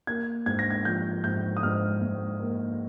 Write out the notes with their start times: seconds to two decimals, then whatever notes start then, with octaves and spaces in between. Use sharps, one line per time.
0.07 A#3 G#6
0.46 G#2 G#6
0.59 A#6
0.70 G#6
0.85 F3 G6
1.24 G#2 G6
1.57 D#6
1.63 G#2 F6
2.02 G#2
2.40 A#3